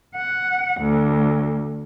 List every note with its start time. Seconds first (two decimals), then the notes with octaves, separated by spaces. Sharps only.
0.16 F#5
0.81 D2